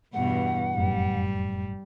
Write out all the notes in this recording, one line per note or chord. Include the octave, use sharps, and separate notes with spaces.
E2 G2 B2 F#5
F1 F#2 A2 G3